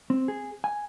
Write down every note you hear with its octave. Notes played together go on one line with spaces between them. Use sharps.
C4
G#4
G#5